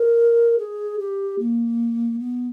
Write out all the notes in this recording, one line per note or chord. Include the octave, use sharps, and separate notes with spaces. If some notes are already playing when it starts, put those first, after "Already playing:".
Already playing: A#4
G#4
G4
A#3
B3